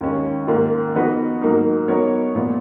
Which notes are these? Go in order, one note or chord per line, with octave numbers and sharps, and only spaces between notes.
D#2 D#3 G#3 C#4
G#2 D#3 A#3 F4
F3 B3 D#4 F#4 B4
G#2 F#3 A#3 D#4 A#4
F#3 B3 D#4 A#4 C#5
A#2 F3 G#3 B3 F4